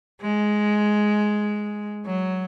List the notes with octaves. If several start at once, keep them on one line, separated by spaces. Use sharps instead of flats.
G#3
F#3